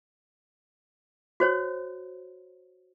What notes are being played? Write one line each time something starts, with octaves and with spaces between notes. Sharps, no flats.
F#4 C5 C#5